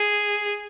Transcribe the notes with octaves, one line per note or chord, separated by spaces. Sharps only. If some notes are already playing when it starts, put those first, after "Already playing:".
Already playing: G#4